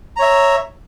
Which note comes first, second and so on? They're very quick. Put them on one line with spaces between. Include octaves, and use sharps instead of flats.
A#5 C#5 E5